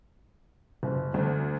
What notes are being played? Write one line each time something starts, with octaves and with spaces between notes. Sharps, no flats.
F#1
D2